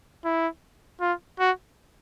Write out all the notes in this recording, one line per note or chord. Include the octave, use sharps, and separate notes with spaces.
E4
F4
F#4